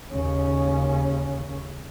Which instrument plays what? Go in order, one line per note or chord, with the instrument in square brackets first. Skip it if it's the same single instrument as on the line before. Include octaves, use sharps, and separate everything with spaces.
[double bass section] D#2 C#3 C#4